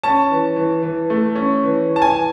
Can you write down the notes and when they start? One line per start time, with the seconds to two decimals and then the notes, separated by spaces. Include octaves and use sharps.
0.04 C#4 A5
0.31 E3
0.56 E3
0.83 E3
1.10 A3
1.35 C#4
1.63 E3
1.90 E3
1.96 A5
2.02 G#5
2.15 E3